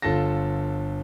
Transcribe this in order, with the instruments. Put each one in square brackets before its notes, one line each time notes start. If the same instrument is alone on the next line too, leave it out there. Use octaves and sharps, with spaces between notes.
[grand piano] G1 F4 A4 A5 A#6